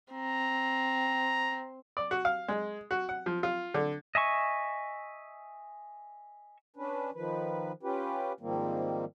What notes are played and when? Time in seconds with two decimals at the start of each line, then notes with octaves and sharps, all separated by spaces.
0.13 C4 A#5
1.97 D5
2.11 F#4
2.25 F5
2.48 G#3
2.91 F#4
3.09 F#5
3.26 F3
3.43 F4
3.74 D3
4.15 D#5 E5 G#5 C#6
6.77 C#4 D4 B4
7.14 D#3 F3 B4
7.83 C#4 F4 G4 B4
8.40 G#2 D#3 F3 G3 A#3 C4